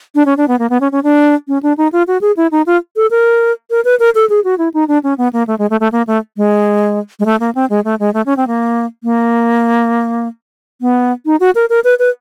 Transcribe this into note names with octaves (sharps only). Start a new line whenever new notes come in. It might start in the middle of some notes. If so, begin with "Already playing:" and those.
D4
C#4
D4
B3
A#3
B3
C#4
C#4
D4
C#4
D4
D#4
F4
F#4
G#4
E4
D#4
F4
A4
A#4
A#4
B4
A#4
A4
G#4
F#4
E4
D#4
D4
C#4
B3
A#3
A3
G#3
A3
A3
A#3
A3
G#3
G#3
A3
A#3
C4
G#3
A3
G#3
A3
C#4
C4
A#3
A#3
B3
D#4
F#4
A#4
A#4
B4
B4